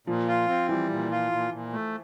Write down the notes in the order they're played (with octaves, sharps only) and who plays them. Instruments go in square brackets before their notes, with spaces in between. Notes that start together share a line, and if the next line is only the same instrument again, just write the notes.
[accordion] A#2 [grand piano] F3
[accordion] F4
C4
[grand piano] E3 [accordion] G3
[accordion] A#2
F4
A#2
A#2
A3